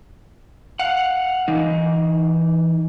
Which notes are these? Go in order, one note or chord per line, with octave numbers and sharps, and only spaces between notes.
F5 F#5
E3 D#4